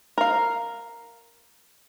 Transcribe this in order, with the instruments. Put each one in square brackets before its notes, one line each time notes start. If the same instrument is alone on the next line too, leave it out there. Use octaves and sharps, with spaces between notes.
[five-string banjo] A#4 F5